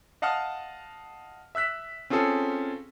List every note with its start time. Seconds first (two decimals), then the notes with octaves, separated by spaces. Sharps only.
0.22 D#5 F5 F#5 A5 D#6 F6
1.55 E5 E6 F#6 B6
2.10 C4 C#4 F4 G#4 A4